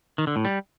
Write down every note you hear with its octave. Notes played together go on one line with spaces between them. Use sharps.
D#3
D3
A2
G3